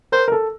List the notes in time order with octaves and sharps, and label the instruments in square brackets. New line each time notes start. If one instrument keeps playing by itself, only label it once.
[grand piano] A#4 [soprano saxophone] C5
[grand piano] A#4
A4